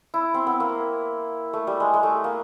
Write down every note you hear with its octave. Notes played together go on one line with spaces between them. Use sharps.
E4
C4
B3
A#3
A3
G3
G#3
G#3
A3
A#3